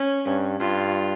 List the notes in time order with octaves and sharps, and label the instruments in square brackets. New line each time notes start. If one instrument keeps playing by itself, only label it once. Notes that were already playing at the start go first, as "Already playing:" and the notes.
Already playing: [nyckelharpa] C#4
[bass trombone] G2
[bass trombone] G2 [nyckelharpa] F4